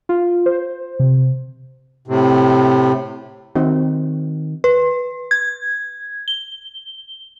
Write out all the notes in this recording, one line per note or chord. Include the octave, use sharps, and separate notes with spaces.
F4
C5
C3
A2 C3
D#3 C4 F#4
B4
G#6
G7